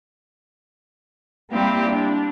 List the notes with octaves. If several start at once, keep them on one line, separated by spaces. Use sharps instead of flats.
G3 A#3 C4 E4 G4
D4